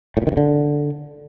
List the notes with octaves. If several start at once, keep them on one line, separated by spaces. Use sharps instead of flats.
A2
A#2
D#3
G2
D3